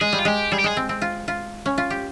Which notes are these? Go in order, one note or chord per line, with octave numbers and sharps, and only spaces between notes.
G#3 G#4
G3
F4
G#3 G4
G3 G#4
G4
G#3 G#4
C4
C4
F4
F4
C#4
F4
G4